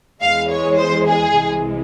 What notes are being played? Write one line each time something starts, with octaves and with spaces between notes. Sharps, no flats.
E2 E3 G#3 F5
C#5
C5
G#4
C2 C3 E3 G#3